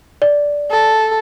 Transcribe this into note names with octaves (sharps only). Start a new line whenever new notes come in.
D5
A4